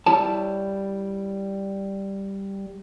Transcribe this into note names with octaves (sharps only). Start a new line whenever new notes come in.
G3 E4 C#5 A5